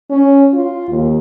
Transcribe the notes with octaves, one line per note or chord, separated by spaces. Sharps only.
C#4
F4
D#2